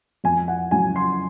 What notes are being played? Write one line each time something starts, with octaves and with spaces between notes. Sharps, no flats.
F2 G#5
F#5
C#3 F#3 G#5
C6